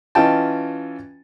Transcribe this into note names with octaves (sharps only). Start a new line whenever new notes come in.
E3 C#4 F4 D#5 G5 A5